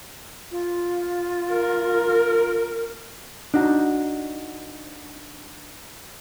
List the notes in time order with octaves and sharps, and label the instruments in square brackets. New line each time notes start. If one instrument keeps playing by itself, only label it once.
[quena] F4
[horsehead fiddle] A#4
[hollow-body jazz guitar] D4 D#4 F#4